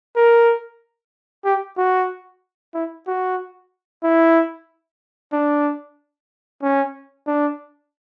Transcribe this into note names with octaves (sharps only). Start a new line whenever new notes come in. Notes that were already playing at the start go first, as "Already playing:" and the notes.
A#4
G4
F#4
E4
F#4
E4
D4
C#4
D4